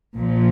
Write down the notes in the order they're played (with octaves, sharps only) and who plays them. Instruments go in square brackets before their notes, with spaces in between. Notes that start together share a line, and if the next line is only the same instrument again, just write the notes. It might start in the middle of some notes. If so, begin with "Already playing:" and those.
[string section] A#1 A#2 F3